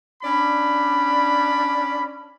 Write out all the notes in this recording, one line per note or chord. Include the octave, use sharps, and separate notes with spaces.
C#4 D4 D5 B5